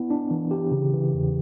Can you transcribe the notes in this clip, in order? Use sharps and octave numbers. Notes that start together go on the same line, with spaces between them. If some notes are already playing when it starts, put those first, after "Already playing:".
Already playing: B3 E4
D4
E3
G4
C#3
E3
E2